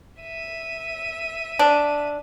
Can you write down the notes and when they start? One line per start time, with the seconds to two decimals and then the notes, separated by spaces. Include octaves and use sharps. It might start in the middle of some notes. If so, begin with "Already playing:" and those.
0.21 E5 D#7
1.59 D4